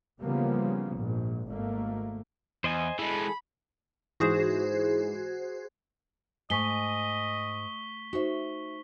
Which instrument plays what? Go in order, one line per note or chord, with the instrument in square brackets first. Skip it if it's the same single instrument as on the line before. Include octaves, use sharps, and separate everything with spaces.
[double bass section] C#3 E3 F3 G3 A#3 B3
A#1 G#2
G#1 G#2 A3 A#3
[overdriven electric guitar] E2 [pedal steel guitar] C5 D#5 G#5
[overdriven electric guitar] E3 G#3 [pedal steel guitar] G#4 A4 [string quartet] B5
[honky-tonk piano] G#2 E3 G#3 [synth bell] F#4 G#4 C5
[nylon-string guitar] G#2 G#5 [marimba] A3 [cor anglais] D#5 [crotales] C#6 B6 G7
[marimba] D#4 C5 [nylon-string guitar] F#4 E5